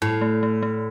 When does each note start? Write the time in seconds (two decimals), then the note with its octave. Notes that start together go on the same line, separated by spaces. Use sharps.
0.02 A2 E4
0.21 A3
0.43 A3
0.62 A3